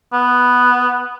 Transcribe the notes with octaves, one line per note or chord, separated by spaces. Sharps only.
B3